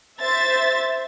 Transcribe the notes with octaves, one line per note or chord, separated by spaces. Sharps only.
C5 E5 A6